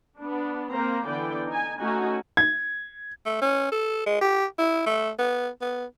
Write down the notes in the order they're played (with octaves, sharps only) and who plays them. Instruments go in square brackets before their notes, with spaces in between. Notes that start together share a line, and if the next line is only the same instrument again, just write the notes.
[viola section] B3 D4
A#3 C4 A#4 C5 A#5
D3 E3 B3 D5 G5
D#4 G#5
A3 C#4 D#4 F#4 G#5
[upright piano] G#6
[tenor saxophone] A3
C#4
A4
G#3
G4
E4
A3
B3
B3